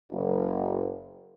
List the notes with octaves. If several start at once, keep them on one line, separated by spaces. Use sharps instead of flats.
F#1